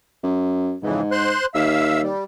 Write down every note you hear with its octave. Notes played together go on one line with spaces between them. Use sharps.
F#2
F2 G#2 C#3 E3
C5 C6 F#6
D#2 E5 F5 E6
G3